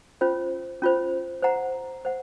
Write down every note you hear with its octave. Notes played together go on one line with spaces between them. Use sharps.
C#4 F4 C5
C#4 F4 C5
C5 F#5 A#5
C5 F#5